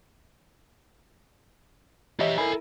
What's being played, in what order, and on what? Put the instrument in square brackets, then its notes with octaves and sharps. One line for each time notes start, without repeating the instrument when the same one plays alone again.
[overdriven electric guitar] E3 G4 [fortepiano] C#5 D#5 E5
[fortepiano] E4 A#4 [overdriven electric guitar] A4 G#5